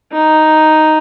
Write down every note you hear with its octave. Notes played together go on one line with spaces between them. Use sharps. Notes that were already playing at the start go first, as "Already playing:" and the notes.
D#4